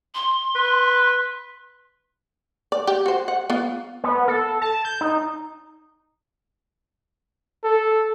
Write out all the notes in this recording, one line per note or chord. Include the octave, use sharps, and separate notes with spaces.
C6
B4
D5
G4
F#4 C5
F#5
B3 F4
B3
A4
A5
G6
D#4
A4